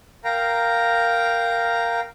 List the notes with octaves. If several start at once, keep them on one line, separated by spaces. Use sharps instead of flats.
A#4 F5 G5 A#5